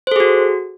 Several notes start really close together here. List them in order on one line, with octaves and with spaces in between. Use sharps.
C5 A4 G#4 F#4